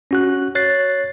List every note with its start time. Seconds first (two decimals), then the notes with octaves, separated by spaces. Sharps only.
0.11 C#4 F#4 F#6
0.55 C#5 F#6 A6 C7